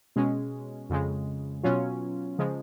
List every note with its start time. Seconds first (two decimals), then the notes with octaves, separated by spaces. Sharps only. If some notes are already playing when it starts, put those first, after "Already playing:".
0.16 B2 G#3 C#4
0.90 F2 C#3 G#3
1.64 B2 F#3 C#4 F4
2.39 C#3 F3 G#3